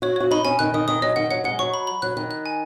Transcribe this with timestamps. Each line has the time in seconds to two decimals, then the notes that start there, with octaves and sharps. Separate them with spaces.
0.02 F#4 C#5
0.16 F#4 C#5
0.31 D#4 B5
0.45 C#4 G#5
0.59 D#3 F#6
0.74 D#3 D#6
0.88 D#3 D#6
1.02 F#3 D#5
1.16 D#3 F#5
1.31 F#3 F#5
1.44 G#3 F#5
1.59 F#3 C#6
1.74 B5
1.87 B5
2.02 F#3 F#6
2.17 D#3 F#6
2.31 F#6
2.46 G#5